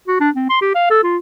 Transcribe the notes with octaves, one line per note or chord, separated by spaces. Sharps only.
F#4
D4
C4
C6
G4
F5
A4
F4